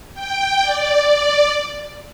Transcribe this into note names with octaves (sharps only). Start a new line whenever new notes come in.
G5
D5
D5